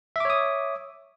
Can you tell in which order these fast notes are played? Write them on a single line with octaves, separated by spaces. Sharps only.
E5 D6 C#5 D#6